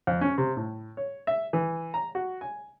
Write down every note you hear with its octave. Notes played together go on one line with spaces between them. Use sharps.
F2
C#4
C3
A2
C#5
E5
E3
A#5
F#4
G#5